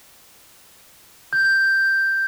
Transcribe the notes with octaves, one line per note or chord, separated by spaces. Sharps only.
G6